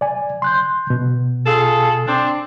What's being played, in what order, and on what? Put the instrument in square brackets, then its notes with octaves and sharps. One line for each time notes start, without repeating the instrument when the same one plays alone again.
[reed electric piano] D5 G#5
C6 F#6 G6
B2
[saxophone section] F4 G#4 A4
C4 D4